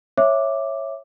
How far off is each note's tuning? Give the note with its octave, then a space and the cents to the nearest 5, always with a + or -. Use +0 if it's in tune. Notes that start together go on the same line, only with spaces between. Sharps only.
C#5 -15 E5 +0 D6 +0